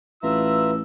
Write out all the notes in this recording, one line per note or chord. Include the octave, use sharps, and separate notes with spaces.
A1 F4 B4 E5 A#5 E6